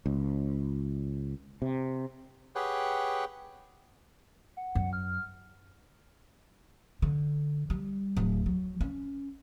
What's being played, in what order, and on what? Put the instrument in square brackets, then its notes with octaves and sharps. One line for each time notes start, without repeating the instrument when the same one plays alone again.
[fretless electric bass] C#2
C3
[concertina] G4 G#4 B4 C#5 F#5 G5
[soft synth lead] F#5
[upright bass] F#2
[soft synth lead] F6
[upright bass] D3
G3
D1
F#3
C#4